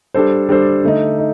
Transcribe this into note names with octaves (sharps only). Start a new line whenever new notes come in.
G3 D4 A4 C5
G3 D4 A4 C5
D3 A3 D#4
D#4